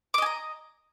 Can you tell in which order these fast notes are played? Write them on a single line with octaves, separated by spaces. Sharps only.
D6 D#5 G#5 A#5